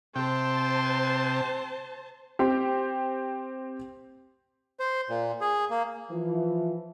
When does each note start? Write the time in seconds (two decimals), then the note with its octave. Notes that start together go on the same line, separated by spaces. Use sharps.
0.16 C3 C5 G5 A5 C6
2.39 C4 G4
4.80 C5
5.09 A#2
5.41 G#4
5.70 A#3
6.11 E3 F3